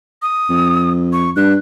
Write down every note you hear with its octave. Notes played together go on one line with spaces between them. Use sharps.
D#6
F2
C#6
G2 F#6